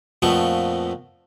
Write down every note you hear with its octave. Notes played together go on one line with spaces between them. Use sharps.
F2 A#2 F3 A3 B3 C#6